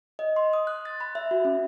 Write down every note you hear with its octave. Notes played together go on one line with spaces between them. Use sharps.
D#5
C6
D#6
F#6
A6
B5
E5
F#4
C#4